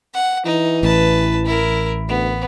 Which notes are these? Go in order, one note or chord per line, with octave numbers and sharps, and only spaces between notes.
F#5
E3 D#4
A1 B4 A5
E4 A#4
D2 B3